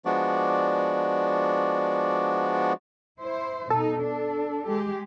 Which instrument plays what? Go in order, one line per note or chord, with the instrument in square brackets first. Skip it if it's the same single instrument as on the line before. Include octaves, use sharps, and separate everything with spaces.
[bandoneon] F3 G#3 B3 D4 F#4 D5
[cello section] E4 C5
[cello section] B2 D#4 [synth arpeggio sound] A4
[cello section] D4
G#3 G4